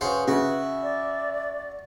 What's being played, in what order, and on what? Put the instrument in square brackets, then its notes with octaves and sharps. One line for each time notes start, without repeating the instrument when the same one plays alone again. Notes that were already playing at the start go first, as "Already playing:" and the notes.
[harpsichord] C#3 C5 F#5 [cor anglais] F#4 [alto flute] B4
[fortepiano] C#3 [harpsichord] F#4 [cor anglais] E5
[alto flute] D5